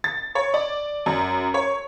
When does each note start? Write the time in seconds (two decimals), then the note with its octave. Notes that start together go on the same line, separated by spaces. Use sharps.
0.04 A6
0.35 C#5
0.54 D5
1.06 F#2
1.54 C#5